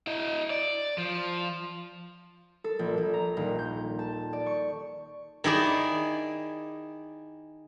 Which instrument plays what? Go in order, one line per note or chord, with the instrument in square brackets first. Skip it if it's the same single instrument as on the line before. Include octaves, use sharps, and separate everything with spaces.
[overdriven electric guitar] E4 D#5
D5
F3
[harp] A4
A#1
A#1
A#5
D#1
G6
A5
D5
C#6
[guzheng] D#3 E4 G#4 D5